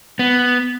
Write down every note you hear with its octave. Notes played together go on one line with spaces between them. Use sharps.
B3